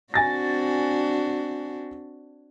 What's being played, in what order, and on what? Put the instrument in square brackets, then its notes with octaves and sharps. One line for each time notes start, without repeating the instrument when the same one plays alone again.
[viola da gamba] C4 D4 F#4 [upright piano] G#5 A6 A#6